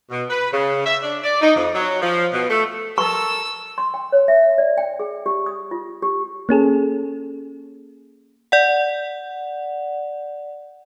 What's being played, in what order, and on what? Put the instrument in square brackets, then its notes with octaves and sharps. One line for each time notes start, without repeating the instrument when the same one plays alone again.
[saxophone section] B2
B4
C#3
E5
D4
D5
D#4
F2
F#3
F3
B2
A3
[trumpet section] A4 A#4 A5 [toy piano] C#6 [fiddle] E6
[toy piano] C6
G5
C#5
E5
D5
G5
G#4
G4
D#6
F4
G4
[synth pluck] A#3 C#4 G#4 A4
[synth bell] D5 F#5